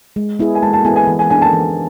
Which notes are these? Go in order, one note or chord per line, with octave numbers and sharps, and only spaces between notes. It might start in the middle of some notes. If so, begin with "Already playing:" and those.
G#3
B3 E4 G#4
G#5
G#3 A5
A5
B3 E4 G#4 G#5
G#5
E3
G#5
B3 D4 G#4 G#5
A5
E3